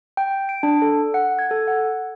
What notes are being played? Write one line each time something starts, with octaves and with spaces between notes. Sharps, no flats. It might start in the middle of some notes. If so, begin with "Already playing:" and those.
G5
D7
D4
A4
F#5
G#6
A4
F#5